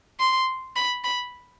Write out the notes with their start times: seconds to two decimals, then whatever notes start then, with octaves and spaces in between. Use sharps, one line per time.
0.20 C6
0.76 B5
1.04 B5